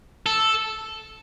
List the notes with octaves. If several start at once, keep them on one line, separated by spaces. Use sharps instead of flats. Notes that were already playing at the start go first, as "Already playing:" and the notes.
A4